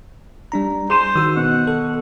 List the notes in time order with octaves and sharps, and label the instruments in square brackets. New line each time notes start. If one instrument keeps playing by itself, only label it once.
[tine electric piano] G3 D4 A#5
[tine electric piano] G#4 [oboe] C5 [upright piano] C6 D#7 E7
[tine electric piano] D#3 F#4 [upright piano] E6
[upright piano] B2 [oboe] F#5
[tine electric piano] A4